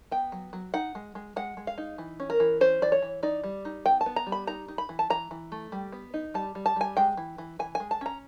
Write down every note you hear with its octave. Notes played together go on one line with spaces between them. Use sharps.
B3 G5
F#3
F#3
D#4 F#5
G#3
G#3
G#3 F#5
G#3
F5
D#4
E3
C#4
A#4
E3
C#4 C5
E3 D5
C#5
E3
D#4 D5
G3
D#4
B3 G5
A5
B3
A#5
G3
B5
D#4 A#5
D#4
B5
E3
A5
E3 A#5
E3
A3
G3
B3
D#4
G3 A5
G3
A5
G3 G#5
G#3 G5
E3
E3
E3 G#5
G#5
G#3
A5
C#4 A#5